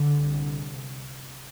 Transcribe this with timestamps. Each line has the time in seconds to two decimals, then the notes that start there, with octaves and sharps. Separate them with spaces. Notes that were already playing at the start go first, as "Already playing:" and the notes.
Already playing: D3
0.13 C2 C3